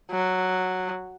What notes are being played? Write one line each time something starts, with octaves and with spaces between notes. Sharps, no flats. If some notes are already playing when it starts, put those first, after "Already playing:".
F#3